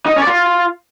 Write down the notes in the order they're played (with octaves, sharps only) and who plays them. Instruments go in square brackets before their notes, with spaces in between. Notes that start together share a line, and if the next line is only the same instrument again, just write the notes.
[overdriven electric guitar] D#4
D#5
C#4
D5
F4